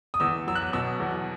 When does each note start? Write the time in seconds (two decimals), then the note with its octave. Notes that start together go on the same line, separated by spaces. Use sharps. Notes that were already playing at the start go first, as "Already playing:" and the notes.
0.14 D#6
0.20 E2 E6
0.47 F#3 E6
0.55 F#6
0.73 B2 E6
1.00 E2